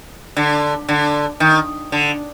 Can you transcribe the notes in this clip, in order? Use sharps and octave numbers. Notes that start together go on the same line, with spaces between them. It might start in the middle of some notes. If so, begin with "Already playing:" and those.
D3
D3
D#3
D3